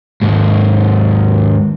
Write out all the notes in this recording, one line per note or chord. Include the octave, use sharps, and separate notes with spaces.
D#2 G#2